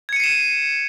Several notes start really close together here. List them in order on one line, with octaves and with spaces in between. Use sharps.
G#6 C#7 D#7 C7 E7